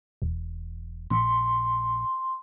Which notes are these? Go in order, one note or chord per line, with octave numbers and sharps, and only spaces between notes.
E1
A#1 C6